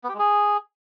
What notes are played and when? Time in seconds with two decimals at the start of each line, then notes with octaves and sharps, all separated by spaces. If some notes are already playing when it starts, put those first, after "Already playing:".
0.04 B3
0.09 G4
0.14 G#3
0.19 G#4